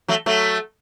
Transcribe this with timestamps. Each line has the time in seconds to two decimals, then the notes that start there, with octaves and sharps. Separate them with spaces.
0.08 F#3 A3
0.26 F#3 A3